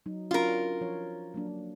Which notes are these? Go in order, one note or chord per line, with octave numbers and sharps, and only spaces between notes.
F#3 D#4
C#4 D4 F4 F#4 A#4
F3 C#5
F#3 A#3 D4